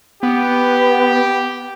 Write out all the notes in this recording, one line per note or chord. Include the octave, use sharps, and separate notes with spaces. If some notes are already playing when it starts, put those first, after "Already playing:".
B3 G4